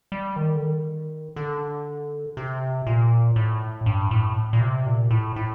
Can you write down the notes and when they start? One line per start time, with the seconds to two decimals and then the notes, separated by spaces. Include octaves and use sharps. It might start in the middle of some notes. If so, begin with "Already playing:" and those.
0.12 G3
0.36 D#3
0.55 D3
0.61 D#3
1.36 D3
2.37 C3
2.87 A#2
3.36 A2
3.86 G2
4.11 A2
4.53 A#2
4.61 C3
4.86 A#2
5.11 A2
5.36 A2